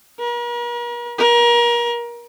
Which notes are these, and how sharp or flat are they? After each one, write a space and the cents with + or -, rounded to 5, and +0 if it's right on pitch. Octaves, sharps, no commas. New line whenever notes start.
A#4 +45
A#4 +30